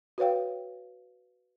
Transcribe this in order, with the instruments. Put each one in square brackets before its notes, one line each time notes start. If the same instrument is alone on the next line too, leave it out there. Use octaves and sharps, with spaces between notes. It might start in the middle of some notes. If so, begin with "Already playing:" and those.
[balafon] F#4 B4 C#5 F5 G5